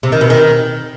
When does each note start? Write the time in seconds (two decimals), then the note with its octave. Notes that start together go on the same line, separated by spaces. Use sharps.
0.03 C3
0.12 D#3
0.21 B2
0.30 D#3